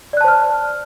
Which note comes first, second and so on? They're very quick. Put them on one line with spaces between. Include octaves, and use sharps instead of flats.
D5 F#6 A5 C5 F6